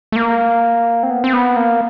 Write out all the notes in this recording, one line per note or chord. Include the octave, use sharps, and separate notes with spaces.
A3
A#3
C4
B3
C4
B3
A#3